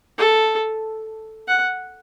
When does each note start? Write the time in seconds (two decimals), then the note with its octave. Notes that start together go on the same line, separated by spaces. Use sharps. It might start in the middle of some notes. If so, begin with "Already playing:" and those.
0.18 A4
1.48 F#5